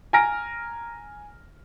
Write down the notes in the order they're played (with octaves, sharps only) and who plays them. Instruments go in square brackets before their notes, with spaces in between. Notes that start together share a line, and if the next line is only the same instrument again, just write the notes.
[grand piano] G#5 A#5 F6 A#6 D7